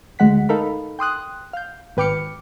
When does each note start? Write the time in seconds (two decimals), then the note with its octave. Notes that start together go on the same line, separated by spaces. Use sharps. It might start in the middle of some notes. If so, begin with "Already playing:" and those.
0.19 D2 G#3 F#5 B6
0.49 D#4 A4 A#4 F5 B5
0.99 G5 C6 D#6 F#6
1.53 F5 G6
1.97 G#1 B4 G5 D6 F6 C#7